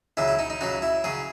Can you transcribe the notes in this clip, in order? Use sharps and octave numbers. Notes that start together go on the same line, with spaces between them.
C#2 C#3 F#3 E4
E4
D#4
D#4
C#2 C#3 F#3 F#4
E4
C#3 F#3 G#4